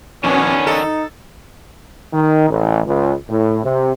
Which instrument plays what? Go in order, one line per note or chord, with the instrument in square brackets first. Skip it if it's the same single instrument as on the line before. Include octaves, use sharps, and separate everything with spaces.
[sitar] F2 B2 [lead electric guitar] D#3 D4 [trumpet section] B3 C#4
[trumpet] D#4 [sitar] A4
[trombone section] D#3
A1
C#2
A2
C3